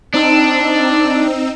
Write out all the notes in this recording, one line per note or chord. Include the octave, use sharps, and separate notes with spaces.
C4 D4 D#4 E6